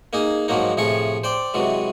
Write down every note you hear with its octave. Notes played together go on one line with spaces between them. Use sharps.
A#3 D#4 G#4
G#2 F3 F#3 A#3 D#4
A2 C3 F3 G#4 C#6
C5 D5 G5
C3 E3 F#3 G#3